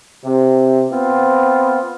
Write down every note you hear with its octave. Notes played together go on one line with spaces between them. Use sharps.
C3
B3 C4 F4